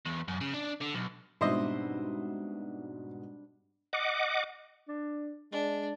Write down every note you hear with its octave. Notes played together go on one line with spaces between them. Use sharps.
E2
F#2
C#3
D4
D3
B1
G#2 B2 G3 C4 D4 E4 C5 D#5
D#5 F#5 D6
D4
G#3 D4